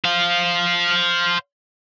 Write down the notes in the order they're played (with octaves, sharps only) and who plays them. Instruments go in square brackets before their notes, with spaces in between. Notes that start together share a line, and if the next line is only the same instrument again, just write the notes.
[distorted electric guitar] C5 F5